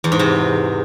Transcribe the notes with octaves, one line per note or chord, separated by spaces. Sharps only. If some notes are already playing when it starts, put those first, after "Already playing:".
E2
G#2
C3